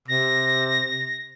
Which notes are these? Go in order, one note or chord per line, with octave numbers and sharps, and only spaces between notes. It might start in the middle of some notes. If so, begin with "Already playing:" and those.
C3 A#6